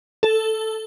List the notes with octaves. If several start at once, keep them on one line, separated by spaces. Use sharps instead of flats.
A4